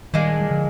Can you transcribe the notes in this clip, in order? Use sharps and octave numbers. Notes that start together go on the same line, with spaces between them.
A#2 D#3 G3 G#3 D4
G3
D3 F3